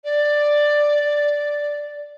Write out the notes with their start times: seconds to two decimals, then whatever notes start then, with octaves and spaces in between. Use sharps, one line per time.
0.04 D5